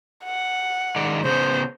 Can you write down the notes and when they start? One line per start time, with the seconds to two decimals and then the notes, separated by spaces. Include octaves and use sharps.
0.24 F#5
0.96 D#3 G#3 D5
1.25 C#3 B3 C5